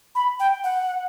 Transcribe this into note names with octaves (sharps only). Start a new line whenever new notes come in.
B5
G5
F#5